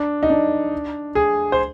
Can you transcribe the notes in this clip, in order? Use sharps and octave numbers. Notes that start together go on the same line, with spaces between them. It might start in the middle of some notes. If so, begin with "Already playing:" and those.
Already playing: D4
D#4
D4
G#4
C5